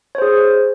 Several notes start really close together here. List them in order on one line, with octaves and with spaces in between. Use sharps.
C#5 C5 G#4